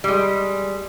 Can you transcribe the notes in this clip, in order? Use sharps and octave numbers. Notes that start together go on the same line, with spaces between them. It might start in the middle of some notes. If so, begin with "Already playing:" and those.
G3 G#3